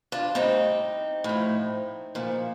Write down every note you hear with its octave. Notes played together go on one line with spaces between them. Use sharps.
D4 F4
A2 G3 C4 D#4
A2 F3
A#2 F3